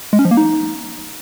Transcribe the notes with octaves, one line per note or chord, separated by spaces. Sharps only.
G#3
C#4
F3
A#3
D#4